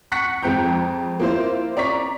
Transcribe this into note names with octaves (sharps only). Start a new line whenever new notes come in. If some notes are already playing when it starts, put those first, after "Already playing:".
F#5 C#6 F#6 A#6 B6 C#7
F2 G#3 C4 G5 A#5 G6
A#3 E4 F4 C5
D5 A#5 C#6 B6